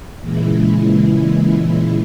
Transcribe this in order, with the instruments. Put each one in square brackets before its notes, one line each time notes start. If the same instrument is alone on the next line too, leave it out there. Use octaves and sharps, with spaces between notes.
[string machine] A#2 C#3 E3 G#3 E4